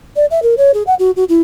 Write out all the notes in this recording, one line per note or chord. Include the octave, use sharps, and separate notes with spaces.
D5
E5
A#4
C#5
G#4
F#5
F#4
F#4
E4